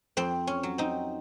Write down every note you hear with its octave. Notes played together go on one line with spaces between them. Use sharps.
F2 C4
C#4
F#3
C4 D#4